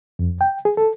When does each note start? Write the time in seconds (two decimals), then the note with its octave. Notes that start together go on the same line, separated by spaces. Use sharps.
0.19 F2
0.41 G5
0.65 G#4
0.77 A4